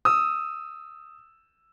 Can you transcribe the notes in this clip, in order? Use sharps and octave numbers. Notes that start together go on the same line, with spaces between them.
D#6 E6